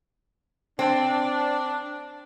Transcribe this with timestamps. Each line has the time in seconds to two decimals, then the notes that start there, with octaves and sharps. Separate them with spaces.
0.79 C4 D4